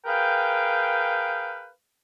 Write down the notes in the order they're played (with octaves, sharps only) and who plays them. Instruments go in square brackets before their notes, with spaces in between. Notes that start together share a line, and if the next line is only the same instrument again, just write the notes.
[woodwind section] G#4 A#4 B4 F5 G5